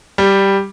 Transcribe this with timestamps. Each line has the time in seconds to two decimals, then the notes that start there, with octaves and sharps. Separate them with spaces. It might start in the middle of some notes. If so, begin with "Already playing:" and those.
0.18 G3